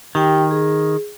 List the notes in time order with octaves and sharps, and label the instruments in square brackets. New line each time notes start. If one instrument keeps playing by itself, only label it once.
[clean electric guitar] D#3 [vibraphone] G4 G5
[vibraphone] G#4